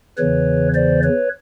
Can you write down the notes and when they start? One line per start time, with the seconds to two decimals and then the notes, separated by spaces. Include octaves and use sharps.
0.18 E2 C#3 E3 B4 C#5
0.74 C5 D5
1.03 B4 C#5